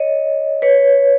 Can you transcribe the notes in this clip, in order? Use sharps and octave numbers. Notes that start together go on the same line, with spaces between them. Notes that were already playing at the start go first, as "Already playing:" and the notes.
Already playing: C#5 D#5
B4 C#5